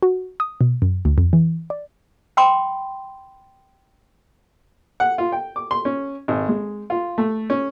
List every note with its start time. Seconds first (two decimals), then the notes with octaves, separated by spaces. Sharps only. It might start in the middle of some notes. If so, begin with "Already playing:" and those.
0.03 F#4
0.40 D#6
0.61 B2
0.82 F#2
1.05 D2
1.18 F2
1.33 E3
1.70 D5
2.37 G5 B5 C6 D6
5.00 F#5
5.18 F4
5.32 G5
5.56 D6
5.71 C6
5.85 C#4
6.28 G#1
6.49 G#3
6.90 F4
7.18 A3
7.50 C#4